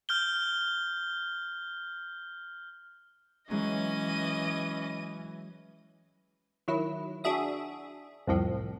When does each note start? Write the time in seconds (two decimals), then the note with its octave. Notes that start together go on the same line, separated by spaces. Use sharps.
0.09 F6 G6 G7
3.50 E3 F#3 G#3 C#4 D#5 D#7
6.68 D#3 F#3 E4
7.24 D4 F#4 G#4 E5 D#6
8.27 C2 F2 A2 F3